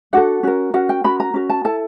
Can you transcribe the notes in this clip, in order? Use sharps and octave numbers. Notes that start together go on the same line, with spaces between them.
D4 F#4 A4 F#5
C#4 F#4 A#4
C#4 F#4 A#4 F#5
G5
C#4 F#4 A#4 B5
A#5
C#4 F#4 A#4
A5
E4 A4 A5